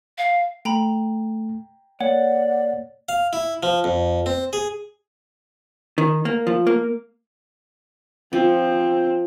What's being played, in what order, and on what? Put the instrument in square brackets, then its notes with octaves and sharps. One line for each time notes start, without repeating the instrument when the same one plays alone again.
[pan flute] F5
[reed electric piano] A3 [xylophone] G5 A#5 B5
[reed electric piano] A#3 [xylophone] C#5 [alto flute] D5 [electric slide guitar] F#5
[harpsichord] F5
E4
F3
F2
C4
G#4
[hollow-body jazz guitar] D#3
A#3
F3
A#3
[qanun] F3 [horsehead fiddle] C4